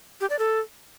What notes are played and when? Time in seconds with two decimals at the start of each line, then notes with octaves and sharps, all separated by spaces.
0.21 G4
0.30 D5
0.39 A4